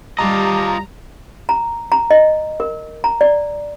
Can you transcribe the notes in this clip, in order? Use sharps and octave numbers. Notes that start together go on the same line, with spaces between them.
G3 F4 G4 D#5 A5 A#5 D6
A#5
A#5
D#5
A#4
A#5
D5